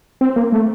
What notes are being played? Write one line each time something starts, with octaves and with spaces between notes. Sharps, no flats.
C4
A#3
A3